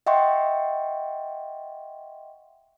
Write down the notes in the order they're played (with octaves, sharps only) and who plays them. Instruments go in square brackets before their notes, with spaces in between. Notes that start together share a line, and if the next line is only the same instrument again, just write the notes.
[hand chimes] D#5 E5 F#5 G5 C6 C#6